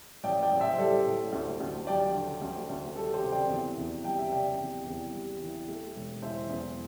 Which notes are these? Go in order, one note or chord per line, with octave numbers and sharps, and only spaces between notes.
A1 D5 G5
D5 G5
A1
C5 E5
G3 A4 D5
A2
D2
D2
G3 D5 G5
D3
D2
D2
G3 A4
G4 C5
C3
D5 G5
E2
E2
G3 G5
E5
C3 D5 G5
E2
E2
G3
E3
A3
E1
E3 C5 E5
E2